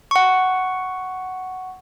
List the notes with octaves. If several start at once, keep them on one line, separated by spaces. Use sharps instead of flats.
F#5 C#6